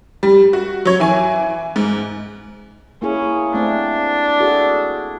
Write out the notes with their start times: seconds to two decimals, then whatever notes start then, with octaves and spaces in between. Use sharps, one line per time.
0.23 G3
0.53 F#4
0.85 F#3 C#5
1.00 E3 G#5
1.76 G#2
3.02 A#3 C#4 E4 G#4
3.54 A3 C4 D4
4.40 F#4 G#4 A4